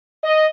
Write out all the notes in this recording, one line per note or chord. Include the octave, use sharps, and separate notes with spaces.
D#5